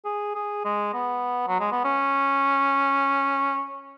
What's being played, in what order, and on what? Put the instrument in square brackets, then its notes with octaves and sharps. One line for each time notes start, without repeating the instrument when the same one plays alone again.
[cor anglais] G#4
G#4
G#3
B3
F#3
G#3
B3
C#4